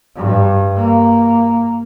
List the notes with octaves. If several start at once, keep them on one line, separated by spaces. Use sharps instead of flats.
G2
A#3